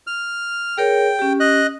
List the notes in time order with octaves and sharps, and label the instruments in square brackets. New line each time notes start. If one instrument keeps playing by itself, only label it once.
[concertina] F6
[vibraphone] G#4 A#4 C#5 [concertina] G5
[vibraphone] C#4 G4
[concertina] D#5 F#6